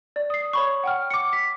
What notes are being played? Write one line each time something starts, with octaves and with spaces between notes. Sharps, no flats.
D5
D#6 C7
C#5 B5 C#6
F#5 G5 F6
D6 C#7
B6